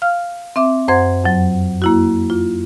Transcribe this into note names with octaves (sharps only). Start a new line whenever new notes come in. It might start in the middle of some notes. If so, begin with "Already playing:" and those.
F5 F6
C4 E5 D6
F#2 C5 F#5 C6 G#6
F2 F#3
A#3 E4 F#4
F4